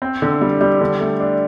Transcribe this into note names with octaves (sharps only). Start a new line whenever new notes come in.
C4
D3
G3
G3
D3
A3
D4